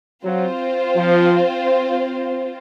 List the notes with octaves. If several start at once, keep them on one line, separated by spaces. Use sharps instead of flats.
F#3 C4 F4 C5
F3